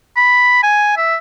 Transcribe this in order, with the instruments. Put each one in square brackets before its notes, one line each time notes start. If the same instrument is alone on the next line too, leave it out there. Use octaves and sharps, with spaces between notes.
[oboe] B5
G#5
E5